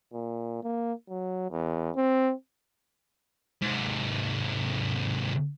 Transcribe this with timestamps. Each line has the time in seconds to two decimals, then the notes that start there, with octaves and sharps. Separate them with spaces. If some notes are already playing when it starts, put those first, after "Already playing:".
0.13 A#2
0.63 A#3
1.09 F#3
1.51 E2
1.96 C4
3.62 G#2 C3